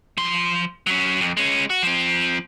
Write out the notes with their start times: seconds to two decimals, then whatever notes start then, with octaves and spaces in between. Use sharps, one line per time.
0.17 F3 C6
0.87 F#3 C#4
1.21 F2
1.37 G#3 C#4
1.70 F#4
1.83 F3 C4